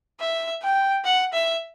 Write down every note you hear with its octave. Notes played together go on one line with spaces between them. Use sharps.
E5
G5
F#5
E5